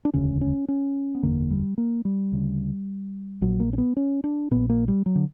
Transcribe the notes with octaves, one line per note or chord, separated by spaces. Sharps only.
D4
E1 D2 C#3 C#4
C#4
C#4
B3
F#1 E2 D3 A#3
G3
A#3
G3
D2 C#3
A#1 A#2 F#3
A#3
C#4
B3
C#4
D4
A#1 A#2 B3
A#3
G3
F#3
D3